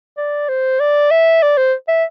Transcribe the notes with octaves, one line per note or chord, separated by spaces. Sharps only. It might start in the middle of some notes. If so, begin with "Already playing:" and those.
D5
C5
D5
E5
D5
C5
E5